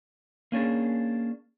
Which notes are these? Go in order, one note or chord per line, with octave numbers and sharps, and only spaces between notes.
A#3 C#4 D4 G#4